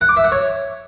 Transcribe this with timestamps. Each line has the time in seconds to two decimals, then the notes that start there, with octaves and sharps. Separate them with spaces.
0.01 F#5
0.09 D6
0.16 E5
0.24 F#5
0.32 C#5